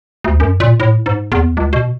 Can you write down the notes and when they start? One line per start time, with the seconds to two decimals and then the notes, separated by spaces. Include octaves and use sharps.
0.24 D2
0.40 F#2
0.60 A#2
0.80 A2
1.06 G#2
1.32 E2
1.57 C#2
1.73 B2